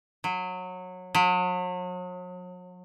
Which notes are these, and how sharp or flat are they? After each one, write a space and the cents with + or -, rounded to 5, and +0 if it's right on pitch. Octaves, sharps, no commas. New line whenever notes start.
F#3 -20
F#3 -40